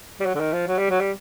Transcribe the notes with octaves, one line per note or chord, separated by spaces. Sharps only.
G3
F#3
D3
D#3
F3
F#3
G3
F#3
G3